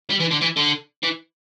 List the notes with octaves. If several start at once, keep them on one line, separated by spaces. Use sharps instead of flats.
G3
E3
D3
E3
D3
E3